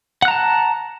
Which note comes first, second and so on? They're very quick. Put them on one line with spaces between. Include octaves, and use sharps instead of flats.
F#5 F#6 A#5 A5